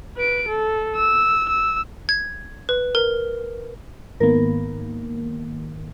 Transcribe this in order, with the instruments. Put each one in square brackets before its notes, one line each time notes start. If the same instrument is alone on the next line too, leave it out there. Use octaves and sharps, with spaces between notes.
[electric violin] B4 D7
A4
E6
E6
[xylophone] G#6
B4
A#4
[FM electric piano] G#2 D#3 A#3 [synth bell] B3 A#4